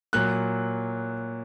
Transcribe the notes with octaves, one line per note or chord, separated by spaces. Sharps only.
A#2 F#3 F#6